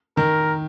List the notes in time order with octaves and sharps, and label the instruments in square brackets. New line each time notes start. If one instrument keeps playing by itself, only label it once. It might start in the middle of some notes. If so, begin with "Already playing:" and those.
[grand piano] D#3 [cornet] A#4